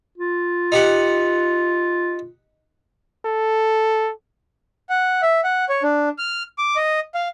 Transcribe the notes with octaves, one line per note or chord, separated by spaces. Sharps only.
F4
D#4 G4 F#5
A4
F#5
E5
F#5
C#5
D4
F6
D6
D#5
F5